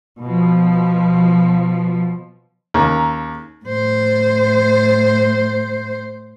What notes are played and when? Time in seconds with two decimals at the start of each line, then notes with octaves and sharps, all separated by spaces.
0.21 B2 F3
2.74 D#2 C#3 A#5
3.65 A2 C5